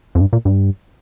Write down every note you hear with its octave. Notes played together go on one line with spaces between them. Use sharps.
F2
G2
A#2
G2